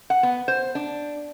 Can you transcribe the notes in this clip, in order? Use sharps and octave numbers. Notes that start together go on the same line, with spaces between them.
F#5
B3
C5
D4